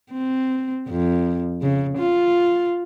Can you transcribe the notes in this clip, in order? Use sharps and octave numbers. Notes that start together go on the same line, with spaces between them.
C4
F2
C#3
F4